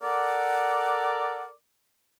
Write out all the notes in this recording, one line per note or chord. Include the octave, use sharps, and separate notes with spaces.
A4 A#4 D5 F#5